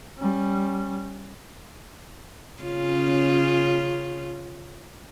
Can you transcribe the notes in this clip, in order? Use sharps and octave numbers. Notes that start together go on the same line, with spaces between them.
G3 C#4
C#3 C#4 F4